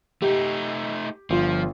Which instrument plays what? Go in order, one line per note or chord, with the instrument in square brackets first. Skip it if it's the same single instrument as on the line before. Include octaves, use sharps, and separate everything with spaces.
[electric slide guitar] A3 D#4 [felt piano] G4
[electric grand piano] G1 F4 [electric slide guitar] F3